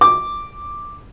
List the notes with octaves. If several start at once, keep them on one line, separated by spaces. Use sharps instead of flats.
D6